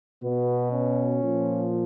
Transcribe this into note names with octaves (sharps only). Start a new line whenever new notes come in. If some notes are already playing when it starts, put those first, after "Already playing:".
B2 B3
C#4
A#2 F3